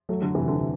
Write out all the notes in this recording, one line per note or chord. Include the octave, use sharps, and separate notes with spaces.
F#3 A3
D3 F#3
C3 E3
D3
C3